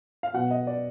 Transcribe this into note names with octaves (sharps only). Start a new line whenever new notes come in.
F5
B2 F#3 B3 F#5
D#5
D5